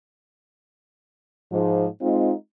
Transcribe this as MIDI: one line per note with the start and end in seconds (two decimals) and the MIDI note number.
1.52 1.87 44
1.52 1.87 53
2.01 2.32 56
2.01 2.32 60
2.01 2.32 63
2.01 2.32 65